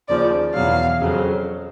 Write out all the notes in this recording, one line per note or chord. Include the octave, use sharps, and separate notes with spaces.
D#2 C#3 F3 D5
E2 B2 F#3 F5
F2 C#3 F#3